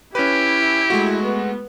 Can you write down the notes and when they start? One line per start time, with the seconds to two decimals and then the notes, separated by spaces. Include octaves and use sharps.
0.15 C#4 E4 G4 B4
0.90 G#3 A3 F#4
1.22 B3